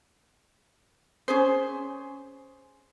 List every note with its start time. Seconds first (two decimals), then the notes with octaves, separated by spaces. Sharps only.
1.28 C#4 G#4 C5